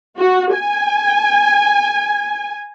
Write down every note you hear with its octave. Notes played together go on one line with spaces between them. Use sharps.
F#4
G#5